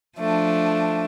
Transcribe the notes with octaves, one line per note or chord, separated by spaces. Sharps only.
F3 A3 D4